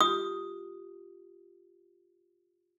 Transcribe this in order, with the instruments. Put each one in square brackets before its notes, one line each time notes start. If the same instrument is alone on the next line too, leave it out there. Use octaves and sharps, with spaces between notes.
[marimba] F4 G4 [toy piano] D#6